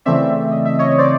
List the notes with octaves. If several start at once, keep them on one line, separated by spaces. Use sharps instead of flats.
C#3 E3 A3 C4 D5 E5
D#5
E5
C#5 D#5
C5 D5